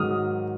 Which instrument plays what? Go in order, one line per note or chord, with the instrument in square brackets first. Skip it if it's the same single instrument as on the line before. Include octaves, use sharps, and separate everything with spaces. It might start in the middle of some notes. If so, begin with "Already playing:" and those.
Already playing: [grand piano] G#2 D#3 F#3 D#6 F6